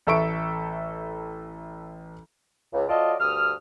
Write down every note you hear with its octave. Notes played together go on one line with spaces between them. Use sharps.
A1 A4 E5 C#6 D7
C#2
F#3 F4 A4 D5 D#5
D2 G2 D#6 F6